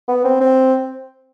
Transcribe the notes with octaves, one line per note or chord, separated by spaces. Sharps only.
B3
C4
C4